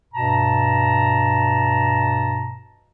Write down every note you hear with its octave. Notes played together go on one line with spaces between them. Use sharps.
G2 B2 A5 A#5